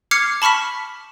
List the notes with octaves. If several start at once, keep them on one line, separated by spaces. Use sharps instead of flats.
D6 F6 G#6 C7 C#7
A5 B5 C#6 F6 B6